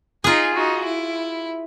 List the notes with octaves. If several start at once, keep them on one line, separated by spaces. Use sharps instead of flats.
D#4 F4 G#4 G#5
D#4 F#4
E4